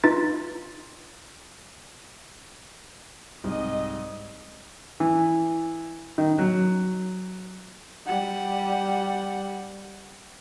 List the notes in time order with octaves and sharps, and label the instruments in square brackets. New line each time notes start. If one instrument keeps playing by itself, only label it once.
[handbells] D#4 F4 B4 A6
[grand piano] C2 [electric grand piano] G#2 [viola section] D#5
[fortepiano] E3
D#3
F#3
[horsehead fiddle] G3 F#5